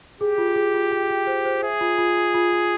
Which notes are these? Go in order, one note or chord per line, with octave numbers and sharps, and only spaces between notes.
G4 G#4
F4
G#4
F4
G5
G5
C5
C5
G#4 E5
F4
F4
F4
F4
F4